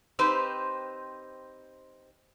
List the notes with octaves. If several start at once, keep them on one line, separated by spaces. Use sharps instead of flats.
C4 D#4 G4 B4 C5